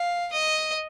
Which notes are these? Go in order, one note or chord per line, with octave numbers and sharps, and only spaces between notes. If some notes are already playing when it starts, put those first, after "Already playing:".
Already playing: F5
D#5